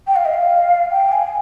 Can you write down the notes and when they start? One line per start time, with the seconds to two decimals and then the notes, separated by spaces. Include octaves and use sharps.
0.07 G5
0.16 F5
0.25 D#5
0.34 F5
0.91 G5
1.12 G#5